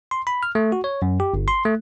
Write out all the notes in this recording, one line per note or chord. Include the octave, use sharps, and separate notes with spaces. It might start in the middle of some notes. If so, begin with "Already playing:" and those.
C6
B5
F6
A3
F#4
C#5
F#2
G4
G1
C6
A3